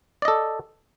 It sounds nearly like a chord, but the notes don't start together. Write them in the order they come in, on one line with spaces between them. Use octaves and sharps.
D5 D#5 A4